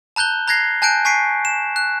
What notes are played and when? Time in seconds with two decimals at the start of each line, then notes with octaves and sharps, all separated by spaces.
0.16 A5 A#5 F#6 G6 G7
0.48 A#5 F#6 G#6 A#6 C7
0.82 G#5 A5 F#6 G6 D7
1.05 G#5 C#6 B6 C7 D7
1.45 E7
1.76 F#6